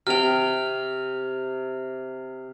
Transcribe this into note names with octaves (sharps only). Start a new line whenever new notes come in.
C3 G5 F6 F7